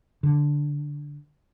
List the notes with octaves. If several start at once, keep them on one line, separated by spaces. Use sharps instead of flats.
D3